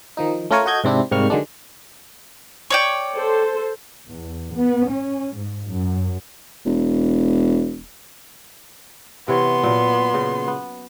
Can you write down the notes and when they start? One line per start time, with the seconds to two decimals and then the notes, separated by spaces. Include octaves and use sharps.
0.17 D#3 F3 D#4
0.51 A3 C#4 F4 A#4 C#5 G#5
0.66 F#4 A4 D#5 G6 G#6
0.84 G#2 C3 C4 D4 E4
1.11 G#2 C3 G3 A#3 C#6 F6
1.30 D3 D#3 F#3 G#3 D4
2.70 C#5 D5 G5
3.13 A4 C5
4.08 E2
4.54 B3
4.90 C#4
5.35 G#2
5.67 F#2
6.65 E1
9.28 C3 E3 B3 C#5 C6
9.63 A#2 F#3
10.14 C#3
10.48 B3